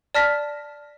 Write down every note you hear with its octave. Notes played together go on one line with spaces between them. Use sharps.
D5 A5 F6 A#6 B6